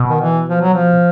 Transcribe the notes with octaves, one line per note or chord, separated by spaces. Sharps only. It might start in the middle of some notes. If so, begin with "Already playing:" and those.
Already playing: B2
D#3
E3
F3
F#3
F3